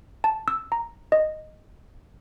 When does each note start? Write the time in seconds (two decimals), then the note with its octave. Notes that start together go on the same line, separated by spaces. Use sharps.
0.24 A5
0.48 E6
0.72 A#5
1.12 D#5